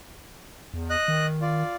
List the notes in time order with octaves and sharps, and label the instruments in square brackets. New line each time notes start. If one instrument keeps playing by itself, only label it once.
[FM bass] E2
[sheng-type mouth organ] D#5 F#6
[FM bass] D#3
[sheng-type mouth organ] F4 D5